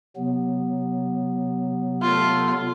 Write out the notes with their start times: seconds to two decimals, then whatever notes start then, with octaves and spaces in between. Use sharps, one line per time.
0.16 C3 F#3 B3
2.01 A3 F4